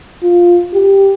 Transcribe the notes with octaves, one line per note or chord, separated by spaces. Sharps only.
F4
G4